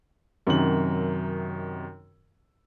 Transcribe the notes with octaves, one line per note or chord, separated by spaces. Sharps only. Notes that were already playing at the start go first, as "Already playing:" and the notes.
F#2 C3 D#3 F#3 C#4 F#7